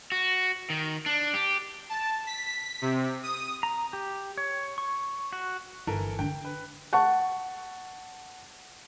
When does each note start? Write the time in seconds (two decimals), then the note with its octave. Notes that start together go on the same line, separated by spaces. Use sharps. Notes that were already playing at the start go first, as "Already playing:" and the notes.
0.12 F#4
0.70 D#3
1.06 D4
1.34 G4
1.89 A5
2.27 B6
2.82 C3
3.23 D#6
3.63 A#5
3.93 G4
4.38 C#5
4.78 C#6
5.33 F#4
5.87 G1 E3 A4 A#4
6.19 D3 D4 G5
6.45 B4
6.93 F#5 A5 C#6